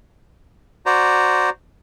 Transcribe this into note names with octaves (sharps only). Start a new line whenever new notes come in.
F#4 C5 D5 A#5